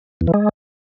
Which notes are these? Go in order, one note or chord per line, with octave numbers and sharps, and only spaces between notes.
E2
E3
G#3